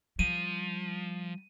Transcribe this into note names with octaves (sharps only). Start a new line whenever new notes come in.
F3 G3 D#7